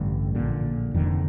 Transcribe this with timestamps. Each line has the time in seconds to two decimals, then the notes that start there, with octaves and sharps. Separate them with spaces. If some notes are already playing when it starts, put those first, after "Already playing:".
Already playing: A1 G2 D3
0.35 A#1 A#2 D3
0.94 F1 F2 D3 D#3